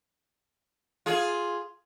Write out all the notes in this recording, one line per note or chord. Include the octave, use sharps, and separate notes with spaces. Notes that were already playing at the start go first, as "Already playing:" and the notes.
F4 G#4